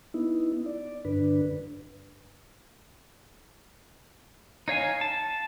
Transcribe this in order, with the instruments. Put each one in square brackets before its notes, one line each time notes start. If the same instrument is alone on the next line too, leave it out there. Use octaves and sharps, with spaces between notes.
[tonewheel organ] B3 D#4 E4
D5
G2 D3 D4 B4
[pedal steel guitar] D#4 C#5 F5 G#5
A5